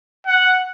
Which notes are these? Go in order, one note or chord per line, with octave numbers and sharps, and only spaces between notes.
F#5